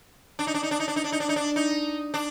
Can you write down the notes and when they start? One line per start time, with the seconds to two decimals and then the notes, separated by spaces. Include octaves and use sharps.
0.39 D4
0.47 D#4
0.54 D4
0.63 D#4
0.71 D4
0.80 D#4
0.88 D4
0.96 D#4
1.04 D4
1.12 D#4
1.20 D4
1.29 D#4
1.36 D4
1.56 D#4
2.14 D4